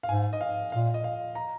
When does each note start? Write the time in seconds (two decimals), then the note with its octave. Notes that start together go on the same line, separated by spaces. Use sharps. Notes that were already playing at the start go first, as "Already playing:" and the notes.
0.03 F5
0.09 G#2 G#5
0.33 D#5
0.41 F5
0.72 A#2 F5
0.94 D#5
1.04 F5
1.35 A#5